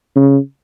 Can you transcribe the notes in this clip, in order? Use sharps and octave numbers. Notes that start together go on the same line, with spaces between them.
C#3